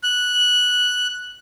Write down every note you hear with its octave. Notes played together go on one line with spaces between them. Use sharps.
F#6